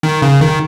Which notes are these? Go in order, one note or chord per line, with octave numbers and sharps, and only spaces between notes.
D#3
C#3
D#3